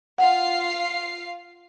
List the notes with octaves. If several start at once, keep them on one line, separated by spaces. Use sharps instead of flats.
F4 F5 F#5 C7